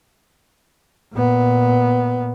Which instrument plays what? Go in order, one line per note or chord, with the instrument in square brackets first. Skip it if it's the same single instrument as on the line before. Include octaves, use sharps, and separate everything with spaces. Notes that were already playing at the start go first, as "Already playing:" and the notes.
[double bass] A#2 B3